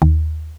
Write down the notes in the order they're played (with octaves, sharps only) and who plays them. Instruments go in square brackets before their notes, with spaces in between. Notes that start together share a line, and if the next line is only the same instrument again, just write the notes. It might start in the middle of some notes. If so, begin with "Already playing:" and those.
[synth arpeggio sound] D#2